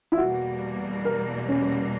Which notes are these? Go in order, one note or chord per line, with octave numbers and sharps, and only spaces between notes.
E4
E2 B2 G3 A#3 F#4
A#4
C#4